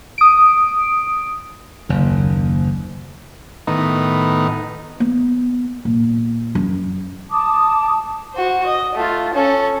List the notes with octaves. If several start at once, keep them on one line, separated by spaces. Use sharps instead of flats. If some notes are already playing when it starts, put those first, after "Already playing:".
D#6 D7
F#1 D#2
A2 D#3 B3 D#4
B3
A#2
F#2
A5 D6 D#6
F#4 C5
D#5
A3 F4
C#4 A4